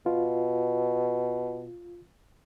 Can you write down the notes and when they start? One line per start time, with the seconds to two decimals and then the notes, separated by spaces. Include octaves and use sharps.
0.06 B2 F4